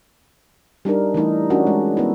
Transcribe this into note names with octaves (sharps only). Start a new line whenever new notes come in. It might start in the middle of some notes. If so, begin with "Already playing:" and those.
G3 D4 D#4 A#4
E3 A3 D#4 E4
C#4 D4 F#4 A#4
G#3
B3 E4